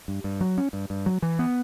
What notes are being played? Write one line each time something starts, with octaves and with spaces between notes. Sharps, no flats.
G2
G2
F#3
C#4
G2
G2
F#3
E3
B3